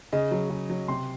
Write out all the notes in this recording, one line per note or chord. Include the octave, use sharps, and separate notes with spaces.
C#3 D#5
F#3
C#3
F#3
C3 C6